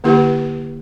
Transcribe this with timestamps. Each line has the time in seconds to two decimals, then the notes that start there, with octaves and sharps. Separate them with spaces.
0.04 D3 A#3 E4 G4 B4